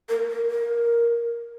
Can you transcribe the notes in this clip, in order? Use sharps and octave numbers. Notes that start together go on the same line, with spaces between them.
A#4
A#4
A#4